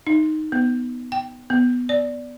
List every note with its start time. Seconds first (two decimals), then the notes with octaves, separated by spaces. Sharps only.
0.07 D#4
0.52 B3
1.12 G5
1.50 B3
1.89 D5